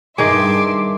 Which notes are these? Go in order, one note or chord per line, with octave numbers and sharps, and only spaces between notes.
G2 D#3 G#4 E5 C6 D6